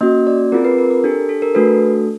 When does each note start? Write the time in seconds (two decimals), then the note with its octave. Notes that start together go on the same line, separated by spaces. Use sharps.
0.01 A#3 C#4 F#4 D#5
0.27 D5
0.52 C4 F4 G#4 A#4
0.65 B4
0.78 A#4
0.91 A#4
1.04 D4 G4 A4
1.29 A4
1.42 A#4
1.55 A3 D4 F#4 A4 B4